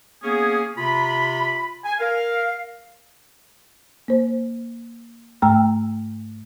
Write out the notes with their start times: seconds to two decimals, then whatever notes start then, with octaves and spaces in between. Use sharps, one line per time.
0.23 A#3 B3 C#4 G#4
0.77 C3 F4 B5
1.85 G#5
2.00 A#4 F5
4.08 A#3 C5
5.42 G#2 A3 G5 A#5 E6 F6